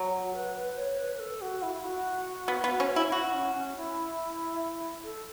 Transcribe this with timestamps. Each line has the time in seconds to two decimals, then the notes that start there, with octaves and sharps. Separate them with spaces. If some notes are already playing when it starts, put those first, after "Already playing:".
Already playing: F#3
0.13 F#4
0.34 B4
0.55 B4
0.77 C#5
0.99 B4
1.16 B4
1.19 A4
1.41 F#4
1.63 E4
1.84 F#4
2.48 B3
2.64 B3
2.80 C#4
2.96 E4
3.12 E4 F#4
3.33 C#4
3.55 C#4
3.76 E4
5.04 A4